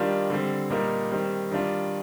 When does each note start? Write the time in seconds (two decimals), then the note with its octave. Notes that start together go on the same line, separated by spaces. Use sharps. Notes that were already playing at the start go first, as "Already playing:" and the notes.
Already playing: D#3 G3 D4 F4
0.30 D3 G3 C4
0.70 A#2 G3 A#3 D#4
1.11 D#3 G3 C4
1.51 D#3 G3 D4 F4